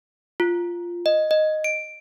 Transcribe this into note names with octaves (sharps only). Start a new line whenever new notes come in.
F4
D#5
D#5
D7